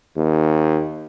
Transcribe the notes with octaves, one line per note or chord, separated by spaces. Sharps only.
D#2